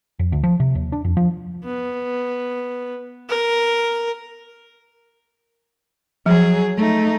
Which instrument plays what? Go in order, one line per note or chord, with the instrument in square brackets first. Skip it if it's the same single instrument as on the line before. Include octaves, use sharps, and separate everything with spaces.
[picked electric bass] F2
D2
F3
C3
D#2
D4
F2
F3
[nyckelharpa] B3
A#4
[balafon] F3 [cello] F#3 G#4
[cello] A3 D#4